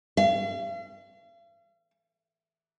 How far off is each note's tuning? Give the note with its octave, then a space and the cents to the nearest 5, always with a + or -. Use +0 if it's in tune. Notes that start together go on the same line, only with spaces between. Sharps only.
F5 -45